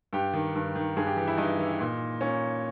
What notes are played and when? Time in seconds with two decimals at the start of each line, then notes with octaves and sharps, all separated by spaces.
0.13 G2 G4
0.33 D#3
0.55 G2
0.76 D#3
0.96 G2 G#4
1.07 G4
1.17 E3 G4
1.28 E4
1.38 G2 D#4
1.59 E3
1.80 A#2
2.21 A#2 C#4